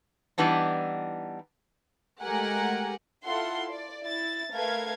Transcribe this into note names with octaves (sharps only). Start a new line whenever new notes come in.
E3 G3 B3 D4 D#4
G#3 A3 G4 A#4 F#5 G#5
E4 F4 A4 F#5 C6
D5
E4 A6
A3 A#4 B4 F5 G#6